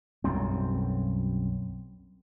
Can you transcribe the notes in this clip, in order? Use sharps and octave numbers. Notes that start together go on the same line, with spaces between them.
B1 F#2 G3 C4